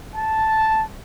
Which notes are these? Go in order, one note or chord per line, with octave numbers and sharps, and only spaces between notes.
A5